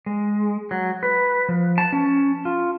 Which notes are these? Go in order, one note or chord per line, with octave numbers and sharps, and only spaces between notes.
G#3
F#3
B4
F3
A5
C#4
F4